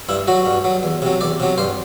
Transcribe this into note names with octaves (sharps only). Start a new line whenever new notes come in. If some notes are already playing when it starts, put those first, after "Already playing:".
G2 E4
F#3 F#4
G2
F#3
E2
C3 F#3
E2 D5
C3 F#3
G2 C5